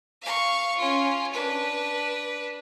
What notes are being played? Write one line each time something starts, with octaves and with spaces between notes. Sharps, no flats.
F5 C#6
C#4 F4
D4 B4